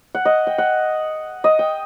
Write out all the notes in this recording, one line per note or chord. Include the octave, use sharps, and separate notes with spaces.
F#5
D#5
G5
F#5
D#5
G5